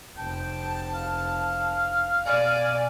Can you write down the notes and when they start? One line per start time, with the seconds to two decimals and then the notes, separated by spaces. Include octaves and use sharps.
0.17 F1 G5 A5
0.95 F5
2.26 B2 D5 G#5